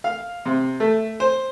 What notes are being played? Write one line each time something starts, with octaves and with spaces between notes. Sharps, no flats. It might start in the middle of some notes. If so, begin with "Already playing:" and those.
F5
C3
A3
C5